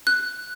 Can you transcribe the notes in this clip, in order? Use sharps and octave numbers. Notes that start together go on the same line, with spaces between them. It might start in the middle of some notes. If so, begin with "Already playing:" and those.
F#6